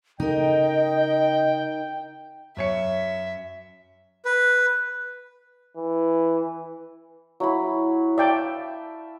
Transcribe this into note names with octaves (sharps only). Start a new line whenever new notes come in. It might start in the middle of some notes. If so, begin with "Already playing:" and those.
C#3 D#4 A#4 D#5 G5
F#2 C#5 E5 C#7
B4
E3
F#3 E4 B5
D5 E5 F5 G5 A5